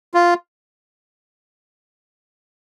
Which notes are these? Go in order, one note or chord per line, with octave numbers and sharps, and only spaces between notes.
F4